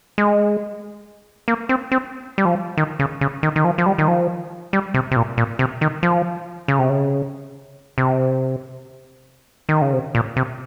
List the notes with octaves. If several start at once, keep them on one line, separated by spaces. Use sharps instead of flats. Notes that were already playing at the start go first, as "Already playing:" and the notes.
G#3
A#3
C4
C4
G3
F3
D#3
C#3
C#3
D#3
D#3
F3
F3
G3
D#3
F3
G3
C3
C3
A#2
A#2
C3
D#3
F3
C#3
C3
C#3
C3
D#3
C#3
C3
A#2
C3